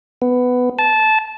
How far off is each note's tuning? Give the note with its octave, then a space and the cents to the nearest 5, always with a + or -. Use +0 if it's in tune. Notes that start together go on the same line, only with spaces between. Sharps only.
B3 +10
A5 -15